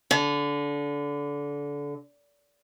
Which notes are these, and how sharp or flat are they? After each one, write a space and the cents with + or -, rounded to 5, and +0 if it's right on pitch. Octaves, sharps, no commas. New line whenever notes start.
D3 -25